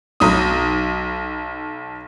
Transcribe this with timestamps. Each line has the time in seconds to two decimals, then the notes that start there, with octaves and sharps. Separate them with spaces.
0.20 B1 D#4 D#6